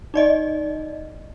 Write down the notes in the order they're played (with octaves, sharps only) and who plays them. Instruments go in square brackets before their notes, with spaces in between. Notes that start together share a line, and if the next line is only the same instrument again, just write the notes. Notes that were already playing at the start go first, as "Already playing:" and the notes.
[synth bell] D#4 D5 D#5